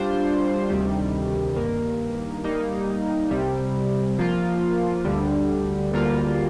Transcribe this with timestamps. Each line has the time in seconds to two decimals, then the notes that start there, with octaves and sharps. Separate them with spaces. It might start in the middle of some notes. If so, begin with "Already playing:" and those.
Already playing: G3 D4 F4 C5
0.70 D2 C3 D#3 G3
1.56 G2 D#3 A#3
2.44 G3 A#3 D#4
3.31 C2 C3 G3
4.18 F3 A#3 F4
5.05 D2 D3 G3
5.91 D2 D3 G3 A#3 F4